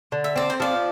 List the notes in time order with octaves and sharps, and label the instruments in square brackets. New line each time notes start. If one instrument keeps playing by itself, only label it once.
[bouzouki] D3
[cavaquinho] E5
[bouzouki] C4 [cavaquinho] D5
[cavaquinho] C5
[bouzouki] F3 [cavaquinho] D5